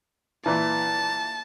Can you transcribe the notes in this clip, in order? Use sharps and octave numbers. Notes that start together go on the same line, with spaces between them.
A#2 E3 A5